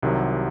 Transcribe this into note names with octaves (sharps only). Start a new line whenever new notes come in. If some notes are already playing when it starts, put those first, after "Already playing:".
C2 C3 D#3 F#3